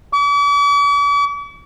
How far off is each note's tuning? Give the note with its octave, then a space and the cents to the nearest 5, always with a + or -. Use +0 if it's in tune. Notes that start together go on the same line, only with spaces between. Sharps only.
D6 -45